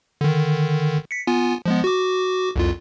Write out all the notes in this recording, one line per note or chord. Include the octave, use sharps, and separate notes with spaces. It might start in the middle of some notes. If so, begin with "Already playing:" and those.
D3 D#3
B6 C#7
B3 F4 G#5
F3 G#3 B3
F#4 D6
C2 F2 F4